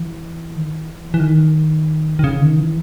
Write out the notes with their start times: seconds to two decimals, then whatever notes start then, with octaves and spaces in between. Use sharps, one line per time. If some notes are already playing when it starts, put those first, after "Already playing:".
Already playing: E3
0.56 D#3
0.69 E3
1.14 E3
1.20 D#3
2.19 D#3
2.24 C#3
2.41 D#3
2.59 E3